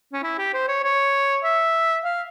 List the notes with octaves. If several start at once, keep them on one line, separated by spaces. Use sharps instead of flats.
C#4
E4
G4
C5
C#5
C#5
E5
F5